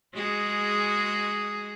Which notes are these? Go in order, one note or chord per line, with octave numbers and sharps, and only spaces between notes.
G#3 F#4 G#4